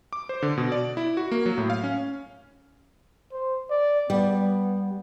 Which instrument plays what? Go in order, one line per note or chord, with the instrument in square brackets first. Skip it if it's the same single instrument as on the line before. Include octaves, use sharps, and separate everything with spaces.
[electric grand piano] D6
C5
D3
B2
D5
E4
F#4
A#3
F#3
A2
F5
C#4
[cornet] C5
D5
[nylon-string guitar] G3 [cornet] B3